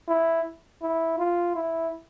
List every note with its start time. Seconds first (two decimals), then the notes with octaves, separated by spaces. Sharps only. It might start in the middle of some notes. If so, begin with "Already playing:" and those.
0.08 E4
0.82 E4
1.18 F4
1.55 E4